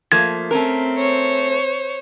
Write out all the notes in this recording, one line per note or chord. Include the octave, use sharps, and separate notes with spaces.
F3 A3 A#3 G#6
A3 C4 C#4 A#4
C5 C#5